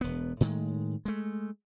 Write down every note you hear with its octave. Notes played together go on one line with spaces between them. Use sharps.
E1 B3
A2 D#3 G#3
G#3 A3